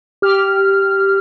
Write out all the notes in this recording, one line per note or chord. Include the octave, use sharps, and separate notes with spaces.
G4 F6